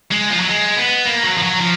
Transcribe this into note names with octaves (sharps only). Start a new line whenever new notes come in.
G#3
F3
F#3
G#3
B3
A#3
F#3
F3
F#3
F3